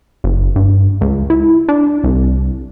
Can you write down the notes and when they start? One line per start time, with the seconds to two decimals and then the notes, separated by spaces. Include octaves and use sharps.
0.24 F#1
0.56 G2
1.01 C#2
1.30 E4
1.68 D4
2.04 C2